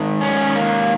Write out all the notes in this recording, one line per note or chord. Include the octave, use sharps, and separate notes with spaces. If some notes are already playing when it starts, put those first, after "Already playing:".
Already playing: G#2 D#3
C#4
A#3